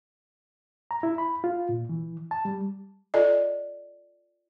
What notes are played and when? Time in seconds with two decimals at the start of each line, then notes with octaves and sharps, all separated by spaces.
0.91 A#5
1.03 E4
1.18 B5
1.44 F4
1.69 A#2
1.89 E3
2.31 A5
2.45 G3
3.14 F4 A4 D5 D#5